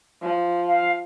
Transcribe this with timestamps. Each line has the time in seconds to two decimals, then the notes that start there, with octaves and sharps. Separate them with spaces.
0.22 F3
0.67 F5